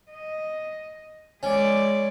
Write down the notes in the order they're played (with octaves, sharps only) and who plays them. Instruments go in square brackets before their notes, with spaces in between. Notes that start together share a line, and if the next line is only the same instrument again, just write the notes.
[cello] D#5
[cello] G#3 D5 [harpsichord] C#4